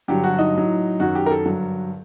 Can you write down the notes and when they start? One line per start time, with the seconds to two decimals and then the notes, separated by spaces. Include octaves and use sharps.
0.08 G2 D3 F#3 G4
0.24 F#4
0.39 D#4
0.54 A2 F#3
1.00 F#2 D#3 F#3 F#4
1.15 G4
1.26 A#4
1.30 A4
1.46 G2 D3 F#3